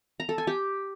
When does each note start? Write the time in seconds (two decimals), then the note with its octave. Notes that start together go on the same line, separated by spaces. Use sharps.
0.20 A#5
0.29 A4
0.38 G#5
0.47 G4